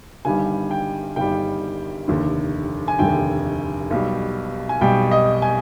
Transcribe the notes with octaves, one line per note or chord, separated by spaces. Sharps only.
G1 G2 D#3 G3 G#5
G5
G1 G2 D#3 G3 G5
F1 D#2 D3
G#5
F1 D#2 D3 G5
B1 B2 G3
G#5
B1 B2 G3 G5
D#5
G#5